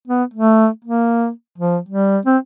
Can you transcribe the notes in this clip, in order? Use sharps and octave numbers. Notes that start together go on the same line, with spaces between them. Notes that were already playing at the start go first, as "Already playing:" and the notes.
B3
A3
A#3
F3
G3
C4